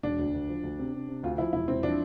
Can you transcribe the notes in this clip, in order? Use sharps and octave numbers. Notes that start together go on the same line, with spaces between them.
E1 D4
D2
D2
F3
D2
C3
C3
C3
D2 F4
F3 E4
E1 E4
E1 C4
F3 D4